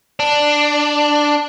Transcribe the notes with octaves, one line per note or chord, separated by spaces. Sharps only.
D4